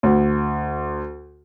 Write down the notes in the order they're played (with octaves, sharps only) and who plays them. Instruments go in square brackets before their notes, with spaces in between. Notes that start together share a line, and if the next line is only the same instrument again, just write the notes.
[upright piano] D2